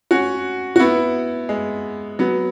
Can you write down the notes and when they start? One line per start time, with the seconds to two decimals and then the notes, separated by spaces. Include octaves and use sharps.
0.11 C#4 F#4
0.76 F#4
0.79 B3 E4
1.49 G#3
2.19 F#3 B3